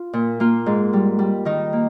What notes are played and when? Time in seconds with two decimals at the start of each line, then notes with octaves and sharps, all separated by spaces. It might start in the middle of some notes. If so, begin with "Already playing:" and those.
Already playing: F4
0.13 A#2
0.40 A#3 F4
0.66 G#2
0.93 G3
1.19 G3
1.45 D#3 D#4
1.73 A#3